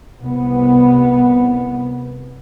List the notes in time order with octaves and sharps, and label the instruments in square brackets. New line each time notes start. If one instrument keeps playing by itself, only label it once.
[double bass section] C2 C3 B3